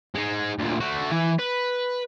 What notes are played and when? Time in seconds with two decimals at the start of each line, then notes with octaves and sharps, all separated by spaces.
0.15 G#3 D#4
0.59 D2 A#2
0.80 A3 F#4
1.12 E3 G#5
1.39 B4